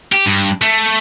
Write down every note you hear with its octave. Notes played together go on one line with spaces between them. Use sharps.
G4
G2
A3